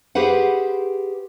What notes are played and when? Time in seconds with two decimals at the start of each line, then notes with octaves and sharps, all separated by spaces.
0.15 G4 G#4 B4 C5 F#5